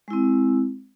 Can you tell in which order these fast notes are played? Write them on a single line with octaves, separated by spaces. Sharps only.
G#3 E4 C4